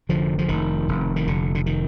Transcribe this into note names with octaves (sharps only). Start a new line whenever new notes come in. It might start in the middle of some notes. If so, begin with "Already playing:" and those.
F1 D3 F3
F3
F1 D#3
F1
D#3
F1 D3
D3
D#3